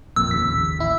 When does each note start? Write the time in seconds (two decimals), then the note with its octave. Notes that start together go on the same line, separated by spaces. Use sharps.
0.16 A1 F2 A#2 E6
0.31 D#2 C#3 B6
0.79 A1 E4